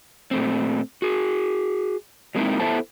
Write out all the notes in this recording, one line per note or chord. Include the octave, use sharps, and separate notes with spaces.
A#2 A3 C4
F#4 G#4
F#3 G#3 A#3 C4 D#4 E4
B3 E4 A4 C5 E5 A5